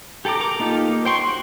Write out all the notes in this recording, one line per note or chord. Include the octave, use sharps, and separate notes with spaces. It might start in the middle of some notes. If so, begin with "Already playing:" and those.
G4 A4 G5 A#5 D6
A#4 A#5 D6
A#3 D#4 F4 G4 A4
A#3
C5 G5 C6 C#6
F#4